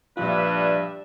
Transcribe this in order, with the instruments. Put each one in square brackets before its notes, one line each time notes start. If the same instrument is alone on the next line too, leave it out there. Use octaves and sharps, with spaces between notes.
[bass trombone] G2 [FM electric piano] A#2 F3 F4 [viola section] G3 D4 E5 [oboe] B4